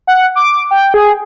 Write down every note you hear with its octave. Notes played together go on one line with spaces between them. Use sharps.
F#5
D6
G5
G#4